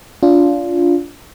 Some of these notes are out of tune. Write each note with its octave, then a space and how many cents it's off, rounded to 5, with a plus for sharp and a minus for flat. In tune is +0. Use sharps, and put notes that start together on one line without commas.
D4 -25 F4 +0